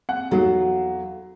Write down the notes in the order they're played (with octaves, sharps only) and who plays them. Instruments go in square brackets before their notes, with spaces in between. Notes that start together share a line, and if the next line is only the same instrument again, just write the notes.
[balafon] C4 [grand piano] F#5
[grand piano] E2 F#3 [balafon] D#4 F#4 [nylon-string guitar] A4 F5 F#5